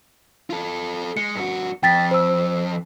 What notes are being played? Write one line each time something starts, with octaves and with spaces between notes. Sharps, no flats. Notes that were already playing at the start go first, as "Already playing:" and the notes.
F4 A4
G#3 C#7
G2 F#4
F2 G5 A6 B6
C5 E6